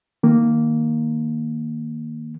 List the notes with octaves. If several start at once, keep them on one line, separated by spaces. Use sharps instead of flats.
D#3 A#3